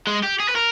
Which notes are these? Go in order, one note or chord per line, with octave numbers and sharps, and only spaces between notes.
G#3
G4
G#4
B4
A#4